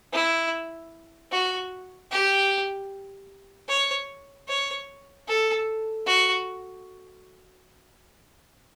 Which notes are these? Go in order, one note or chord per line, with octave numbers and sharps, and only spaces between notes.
E4
F#4
G4
C#5
C#5
A4
F#4